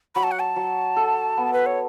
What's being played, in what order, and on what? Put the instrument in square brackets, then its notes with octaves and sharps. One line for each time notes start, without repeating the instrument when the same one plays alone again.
[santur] F#3 [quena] B5
[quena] A5
F#5
A5
[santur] F#3
A4
B3
[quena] B4
C#5